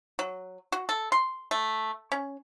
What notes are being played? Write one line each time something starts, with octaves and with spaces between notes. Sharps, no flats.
F#3
F#4
A4
C6
A3
C#4